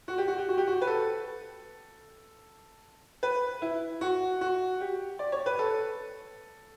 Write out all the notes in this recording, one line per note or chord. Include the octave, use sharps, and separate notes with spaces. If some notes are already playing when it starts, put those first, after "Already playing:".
F#4
G4
F#4
G4
F#4
G4
F#4
B4
A4
B4
E4
F#4
F#4
G4
D5
C#5
B4
A4